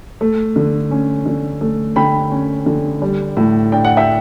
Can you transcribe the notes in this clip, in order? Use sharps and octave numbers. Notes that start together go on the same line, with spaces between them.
A3
D3
C#4
D3
A3
D3 G5 B5
C#4
D3
G3
A2
D4 G5
F#5
E5 G5